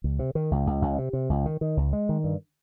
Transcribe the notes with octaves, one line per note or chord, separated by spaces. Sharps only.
C#2
C3
D#3
C#2
C#2
C#2
C3
C3
C#2
D#3
D#3
C#2
G#3
D#3
G2